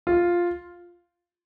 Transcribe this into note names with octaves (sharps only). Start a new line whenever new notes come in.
F4